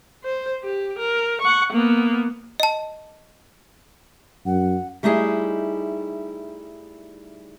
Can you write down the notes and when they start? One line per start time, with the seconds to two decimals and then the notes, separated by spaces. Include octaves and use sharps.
0.24 C5
0.63 G4
0.99 A#4
1.41 F#5 C#6
1.72 A#3 B3
2.60 D#5 A5
4.46 F#2 F#5
5.03 G3 A3 D#4 E4 G#4 D#5